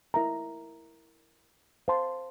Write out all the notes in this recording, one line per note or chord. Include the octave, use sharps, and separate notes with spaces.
E4 A#4 E5 A#5
C5 F5 A5 C6